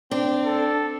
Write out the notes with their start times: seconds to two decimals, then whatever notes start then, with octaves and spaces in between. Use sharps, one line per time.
0.11 C4 D4
0.46 A4